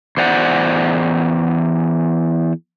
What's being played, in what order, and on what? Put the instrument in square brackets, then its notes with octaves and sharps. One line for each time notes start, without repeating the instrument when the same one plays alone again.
[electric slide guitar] E2 C5 D5 F#5